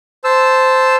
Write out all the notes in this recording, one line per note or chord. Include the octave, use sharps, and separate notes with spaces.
C5 A5 E6